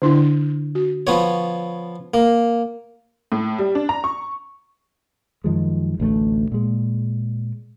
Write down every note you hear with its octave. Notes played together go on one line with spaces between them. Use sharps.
D3 D4 E4
F#4
F3 B3 C#5
A#3
A2
G3
D4
A#5
C#6
F#2 D#3 F3 G#3
A1 D2 G#3 A3
A#2 G#3